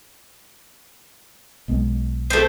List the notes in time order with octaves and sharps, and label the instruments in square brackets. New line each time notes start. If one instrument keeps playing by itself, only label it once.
[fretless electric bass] B1 G#3 B3
[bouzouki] A3 C4